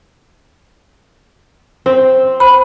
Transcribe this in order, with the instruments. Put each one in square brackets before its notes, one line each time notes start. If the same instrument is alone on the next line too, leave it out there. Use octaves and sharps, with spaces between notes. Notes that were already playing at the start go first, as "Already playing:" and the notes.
[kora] C4
[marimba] C5 B5